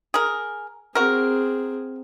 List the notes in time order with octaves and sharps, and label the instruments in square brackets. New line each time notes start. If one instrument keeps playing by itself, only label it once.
[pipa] G#4 A#4
[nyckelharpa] C4 G#4 [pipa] F#4 A#4